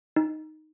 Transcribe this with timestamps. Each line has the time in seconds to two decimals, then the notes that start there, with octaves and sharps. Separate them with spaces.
0.16 D#4